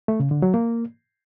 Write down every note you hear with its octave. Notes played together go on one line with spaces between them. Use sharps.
A3
C#3
D3
F#3
A#3